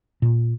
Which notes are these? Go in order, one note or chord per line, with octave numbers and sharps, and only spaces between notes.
A#2